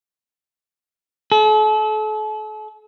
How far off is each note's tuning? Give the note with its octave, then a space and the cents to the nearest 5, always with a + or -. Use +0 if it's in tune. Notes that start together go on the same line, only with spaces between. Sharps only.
A4 -40